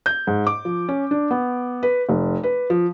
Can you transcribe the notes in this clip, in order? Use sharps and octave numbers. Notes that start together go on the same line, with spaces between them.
G6
G#2
D6
F3
C#4
D4
B3
B4
F1
B4
F3